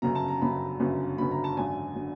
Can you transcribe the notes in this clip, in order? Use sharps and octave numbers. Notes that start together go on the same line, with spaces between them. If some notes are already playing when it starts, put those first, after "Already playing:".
G1 F#2 C#3 F#3 A#5
A5
A#5
G1 F#2 C#3 F#3 B5
G1 F#2 C#3 F#3
G1 F#2 C#3 F#3 B5
A#5
A5
G#1 F#2 D3 F#3 G#5
D3 F#3